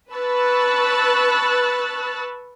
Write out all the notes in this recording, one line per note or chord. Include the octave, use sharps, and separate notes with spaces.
B4 A5 C#6 E6 F#6 A6